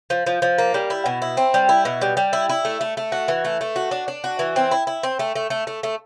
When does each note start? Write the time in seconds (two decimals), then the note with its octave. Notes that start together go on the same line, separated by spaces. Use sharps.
0.10 F3
0.26 F3
0.42 F3
0.58 A#3
0.74 G3
0.90 E4
1.06 B2
1.22 E4
1.37 C4
1.54 G3
1.69 E4
1.85 B2
2.01 G3
2.17 G3
2.33 E4
2.49 E4
2.65 A3
2.81 A3
2.97 A3
3.12 F#4
3.28 E3
3.45 A3
3.61 A3
3.76 F#4
3.91 D4
4.08 D4
4.24 F#4
4.39 E3
4.56 C4
4.71 E4
4.87 E4
5.03 C4
5.19 A3
5.36 A3
5.50 A3
5.67 A3
5.83 A3